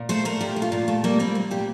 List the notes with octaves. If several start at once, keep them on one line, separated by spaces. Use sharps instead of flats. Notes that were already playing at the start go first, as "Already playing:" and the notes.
Already playing: A#2
A3 C5
A3 A#4
A#2 G4
A3
F4
A#2
A3
G3 A#3
G3 C4
A#2
A#2 G4